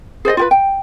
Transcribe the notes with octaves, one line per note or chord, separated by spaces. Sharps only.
G#4 C5 D5 D#5
F4 G4 B4
G5